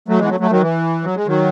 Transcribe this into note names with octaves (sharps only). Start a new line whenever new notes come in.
F#3 A3
E3 G#3
B3
F#3 A3
F#3 A3
D#3 F#3
E3
F#3
G#3
D#3 F#3